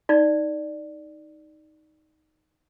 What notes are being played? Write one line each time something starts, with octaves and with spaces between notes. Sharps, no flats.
D#4 D5